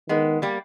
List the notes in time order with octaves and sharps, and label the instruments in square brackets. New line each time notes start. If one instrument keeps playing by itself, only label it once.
[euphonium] D#3 [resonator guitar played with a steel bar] G#3 B3
[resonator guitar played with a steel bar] G3 A#3